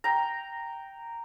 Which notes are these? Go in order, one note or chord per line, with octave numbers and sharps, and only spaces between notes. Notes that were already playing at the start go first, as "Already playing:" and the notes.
G5 A#5